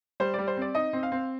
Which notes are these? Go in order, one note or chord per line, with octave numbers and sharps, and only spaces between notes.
G3 C5
G3 D5
C5
C4 D5
D#4 D#5
C4
F5
C4